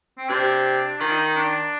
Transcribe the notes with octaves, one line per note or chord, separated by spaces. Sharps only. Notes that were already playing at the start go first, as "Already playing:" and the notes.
C4
C3 D4
D#3 F4
D4
D#4
D4